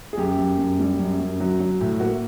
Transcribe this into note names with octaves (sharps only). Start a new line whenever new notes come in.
G#4
F#2 G4
F#2
F#2
G3
F#2
F#2
F#3
F#3
A2
A#3 F#4